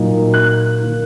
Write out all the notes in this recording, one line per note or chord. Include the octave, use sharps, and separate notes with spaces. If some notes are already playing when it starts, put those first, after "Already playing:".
Already playing: A#2 F#3 A#3 D#4
F#6
D#3 A#3 D#4